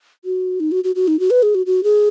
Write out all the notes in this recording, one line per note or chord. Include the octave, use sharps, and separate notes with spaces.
F#4
D#4
F#4
F#4
F#4
D#4
F#4
B4
G#4
F#4
F#4
G#4